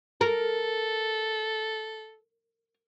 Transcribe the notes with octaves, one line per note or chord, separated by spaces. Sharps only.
A4 A#4